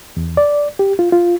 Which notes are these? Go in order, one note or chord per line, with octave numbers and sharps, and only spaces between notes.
E2
D5
G4
F4
F4